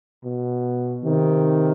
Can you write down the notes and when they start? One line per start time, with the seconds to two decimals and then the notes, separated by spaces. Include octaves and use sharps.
0.24 B2
1.04 C3 D#3